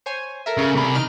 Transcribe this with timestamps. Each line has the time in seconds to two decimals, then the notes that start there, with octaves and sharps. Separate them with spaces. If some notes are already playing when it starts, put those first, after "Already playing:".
0.06 C5 C#5 G#5
0.46 A4 A#4 E5
0.58 C#3
0.75 C3 B5
0.95 D#4 F6 D7